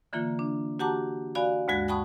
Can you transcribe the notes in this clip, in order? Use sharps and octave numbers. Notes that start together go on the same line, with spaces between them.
D3 E3 A#3 F4
D4
F#4 G4 F#5 A5 A#5 D6
F#4 D5 F5 G#5 B5
D2 G2 G#3 F#4 G#6 A#6
F#5 G5 A5 B5 C#6 D#6